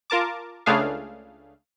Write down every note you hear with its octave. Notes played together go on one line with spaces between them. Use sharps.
F4 A#4 A5 D6
C#2 C#3 A3 D4 G#4 F5